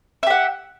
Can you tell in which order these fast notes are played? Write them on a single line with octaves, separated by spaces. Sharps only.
E5 G4 F#5